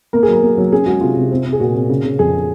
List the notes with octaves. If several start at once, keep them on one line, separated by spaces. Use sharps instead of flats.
A#3 A#4
G#4
F#3 A#4
A#3
F#3
C#4 G#4
G#3 F#4
C3 F4
C3
C4
C4
G#4
A#2 F#4
C4
C#3
C#3
F2 G#4